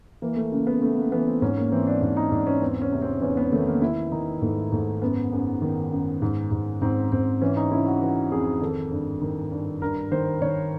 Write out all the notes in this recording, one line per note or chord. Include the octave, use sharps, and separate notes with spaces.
E3 A#3
A3
C#3 A#3
B3
C#3 A3
A#3
E3 B3
C4
G#2 C#4
A#3
E3 C4
D4
G#2 D4
D#4
G#2 D4
C#4
E2 C4
C#4
C3
C4
E2 C#4
B3
D#3 A3
A#3
D#3 E4
D#3 D#4
G#2 A3
G#2 A3
F#2 B3
F#2
D#3
F#2
G#2
G#2
G#2 C4
G#2 C4
E3 C#4
D#4
C#3 E4
F#4
E3 F#4
F2 G#4
D#3 A4
G2
D#3
G2
G2 A#4
D#3 C5
D#3 C#5